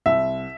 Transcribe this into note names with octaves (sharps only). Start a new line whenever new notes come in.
C2 E5